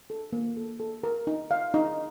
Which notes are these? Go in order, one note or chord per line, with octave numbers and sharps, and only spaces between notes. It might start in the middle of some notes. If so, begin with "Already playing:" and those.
A4
A#3
A4
A4
A#4
D#4
F5
D#4